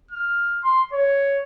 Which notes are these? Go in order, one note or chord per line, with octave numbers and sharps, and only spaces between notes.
F6
C6
C#5